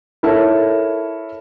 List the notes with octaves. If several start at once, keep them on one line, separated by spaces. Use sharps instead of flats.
E4 A4 A#4 C#5